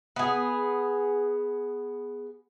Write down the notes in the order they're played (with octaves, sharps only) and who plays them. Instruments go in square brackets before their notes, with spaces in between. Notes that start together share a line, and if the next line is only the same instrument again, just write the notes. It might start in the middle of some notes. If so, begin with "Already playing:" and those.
[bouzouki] B3 G#4